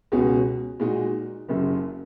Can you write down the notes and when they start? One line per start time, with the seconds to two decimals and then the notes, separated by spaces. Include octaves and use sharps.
0.12 C#2 B2 G#3 C#4 F#4
0.80 A#2 G#3 D#4 F#4
1.49 F#1 F#2 C#3